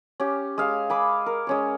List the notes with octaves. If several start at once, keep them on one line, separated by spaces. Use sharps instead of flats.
C#4 G4
G#3 F5
G#5 B5 D6
A#4
G#3 C#4 C#5